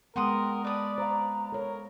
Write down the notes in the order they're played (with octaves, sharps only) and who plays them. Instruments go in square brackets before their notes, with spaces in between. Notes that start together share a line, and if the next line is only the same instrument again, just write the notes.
[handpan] G#3 B3 [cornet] A#4 [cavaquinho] F#5 C6 D#6 [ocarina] G5
[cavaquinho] B4 D#6 [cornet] D5 [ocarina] A5
[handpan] C5 F5 [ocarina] A#5
[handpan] A4 C#5 [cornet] A#4